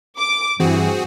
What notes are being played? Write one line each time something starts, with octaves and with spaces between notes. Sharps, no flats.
D6
G2 E3 C4 F#4 G#4